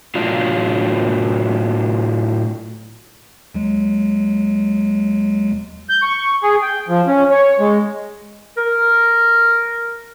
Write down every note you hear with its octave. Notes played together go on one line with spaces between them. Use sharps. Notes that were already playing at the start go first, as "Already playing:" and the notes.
A2 F#3 D4 F4 F5
D#2 F#3 G#3
G6
C#6
G#4
G5
F3
C#4
C#5
G#3
A#4